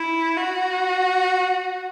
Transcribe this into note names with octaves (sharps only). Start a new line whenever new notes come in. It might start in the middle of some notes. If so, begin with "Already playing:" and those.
Already playing: E4
F#4